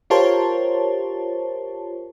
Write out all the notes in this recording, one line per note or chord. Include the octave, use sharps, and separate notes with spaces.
F4 G4 A#4 C5 C#5 A5